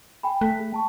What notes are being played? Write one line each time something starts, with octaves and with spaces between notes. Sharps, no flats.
G5 G#5 B5
A3 F#6 B6
G#4
G5 A5 C#6